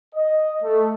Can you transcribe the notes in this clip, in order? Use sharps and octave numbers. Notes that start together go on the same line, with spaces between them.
D#5
A3